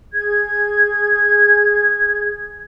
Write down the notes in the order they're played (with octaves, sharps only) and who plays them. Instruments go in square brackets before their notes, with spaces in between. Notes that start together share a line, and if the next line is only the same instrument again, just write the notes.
[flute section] G#4 G#6